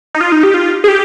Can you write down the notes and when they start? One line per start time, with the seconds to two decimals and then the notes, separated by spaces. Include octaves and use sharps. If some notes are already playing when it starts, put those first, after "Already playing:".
0.14 D#4
0.21 F4
0.32 D#4
0.43 G4
0.54 F4
0.84 G#4
0.88 G4